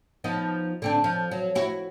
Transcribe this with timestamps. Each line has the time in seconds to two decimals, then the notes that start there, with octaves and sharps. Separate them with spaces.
0.24 F3 B3 D#4
0.82 D3 C4 D4
1.04 F3
1.31 F#3
1.55 E4 F#4